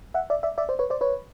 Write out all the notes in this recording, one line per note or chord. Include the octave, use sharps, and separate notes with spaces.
E5 F#5
D5 E5
D5 E5
D5 E5
C5 D5
B4 C#5
C5 D5
B4 C#5